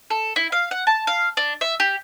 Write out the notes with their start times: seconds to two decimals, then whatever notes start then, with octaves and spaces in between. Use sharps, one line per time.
0.10 A4
0.36 E4
0.52 F5
0.71 F#5
0.87 A5
1.07 F5
1.37 D4
1.61 E5
1.80 G4